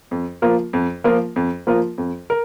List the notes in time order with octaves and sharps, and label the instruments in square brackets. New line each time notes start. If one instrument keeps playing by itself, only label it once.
[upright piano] F2
F3 A#3 F4 A#4
F2
F3 A#3 F4 A#4
F2
F3 A#3 F4 A#4
F2
A#4